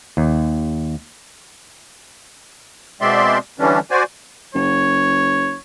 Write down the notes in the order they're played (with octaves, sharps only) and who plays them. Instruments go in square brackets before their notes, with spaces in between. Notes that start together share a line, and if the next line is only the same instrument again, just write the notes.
[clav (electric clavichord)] D#2
[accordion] B2 G#3 C4 D5 E5 C6
D3 E3 G3 C#4 D4
F#4 C5 D5 G#5
[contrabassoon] F#1 [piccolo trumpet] C#5